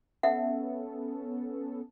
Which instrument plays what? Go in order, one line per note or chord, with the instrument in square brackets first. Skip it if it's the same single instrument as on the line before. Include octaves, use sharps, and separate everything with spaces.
[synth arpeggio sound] B3 C#4 A4 [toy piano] E5 F#5